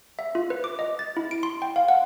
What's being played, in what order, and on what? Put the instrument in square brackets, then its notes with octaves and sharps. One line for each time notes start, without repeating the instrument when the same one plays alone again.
[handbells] E5
F4
B4
D6
D#5
A6
E4
D7
C6
G5
F5
F#5